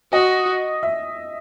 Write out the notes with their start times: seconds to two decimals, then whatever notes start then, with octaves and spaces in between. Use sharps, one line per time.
0.12 F#4 D#5
0.83 E5